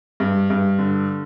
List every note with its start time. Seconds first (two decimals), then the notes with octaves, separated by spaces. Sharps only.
0.20 G2
0.50 G2
0.78 D3